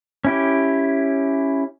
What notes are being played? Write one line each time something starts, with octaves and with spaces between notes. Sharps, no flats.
C#4 E4 G4